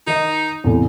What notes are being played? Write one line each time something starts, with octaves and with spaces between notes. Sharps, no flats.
D#3 D#4 D#5
E2 A2 C3